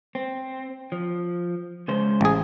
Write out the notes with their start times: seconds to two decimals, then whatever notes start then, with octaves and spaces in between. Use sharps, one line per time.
0.15 C4
0.92 F3
1.88 C#3 G#3 C5
2.21 A1 G#4